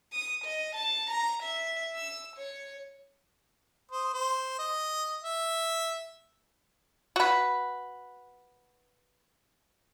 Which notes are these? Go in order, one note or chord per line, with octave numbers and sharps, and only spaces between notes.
D#6
D#5
A5
A#5
E5
E6
C#5
C5 D#6
C5
D#5
E5
F#4 B4